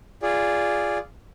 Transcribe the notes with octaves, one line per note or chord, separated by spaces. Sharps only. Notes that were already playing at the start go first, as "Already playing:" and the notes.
F4 G#4 D5